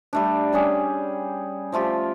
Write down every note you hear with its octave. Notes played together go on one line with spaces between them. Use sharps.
G3 A3 D4
G3 C#4 G#4
F3 A3 F4 G4